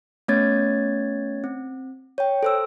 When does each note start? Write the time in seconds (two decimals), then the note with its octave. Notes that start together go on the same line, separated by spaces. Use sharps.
0.28 A3 B3 C#4 C#5 G#6 A6
1.44 C4
2.18 C#5 G5
2.43 A4 C5 E6